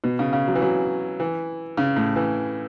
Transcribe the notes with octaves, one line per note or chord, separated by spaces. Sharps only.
B2
C#3
C#3
F#3
E3
F#3
E3
C#3
A2
E3